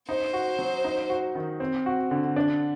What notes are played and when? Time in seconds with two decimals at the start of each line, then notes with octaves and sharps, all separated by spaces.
0.09 D#4 C5
0.33 F#4
0.59 F#3
0.84 D#4
1.09 F#4
1.35 D#3
1.60 C4
1.86 F#4
2.11 D3
2.36 D4